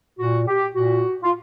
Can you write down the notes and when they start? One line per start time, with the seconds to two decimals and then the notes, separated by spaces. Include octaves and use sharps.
0.19 A#2 F#4
0.47 G4
0.74 A#2 F#4
1.23 F4